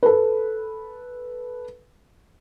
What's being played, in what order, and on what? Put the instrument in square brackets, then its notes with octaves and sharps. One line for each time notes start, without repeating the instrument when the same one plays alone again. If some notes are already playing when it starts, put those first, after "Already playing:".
[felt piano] A4 B4